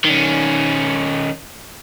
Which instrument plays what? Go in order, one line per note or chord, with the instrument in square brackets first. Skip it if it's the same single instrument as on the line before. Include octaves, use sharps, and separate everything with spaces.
[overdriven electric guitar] D#3 C#4